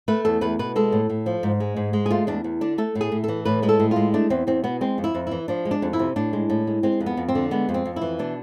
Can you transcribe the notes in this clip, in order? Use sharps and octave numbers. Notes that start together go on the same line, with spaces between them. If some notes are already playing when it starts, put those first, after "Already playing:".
A3 B4
E2 A4
E2 B4
B2 B4
G#3 A4
A2
A2
F3
G#2
G#3
G#2
G#3
G#4
A3 F4
E2 D4
E2
D3 D4
A3 A4
A2
G#4
A2
E3 A4
A2 B4
G#3 B4
A4
A2
G#3 F4
A3 D4
E2 C4
E2 C4
B2 B3
G#3 C4
F2
E4
F2
E3 E4
F3 D4
G#3
D4
F2
E4
C3
A2 D4
G#3
A2
G#3
G#3 C4
F2
B3
F2
C4
D3
G#3 B3
F2
C4
F2
E4
E3
B2 D4